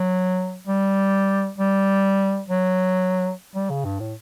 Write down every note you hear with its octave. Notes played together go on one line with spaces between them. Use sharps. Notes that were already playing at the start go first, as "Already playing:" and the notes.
Already playing: F#3
G3
G3
F#3
G3
C#3
G2
A2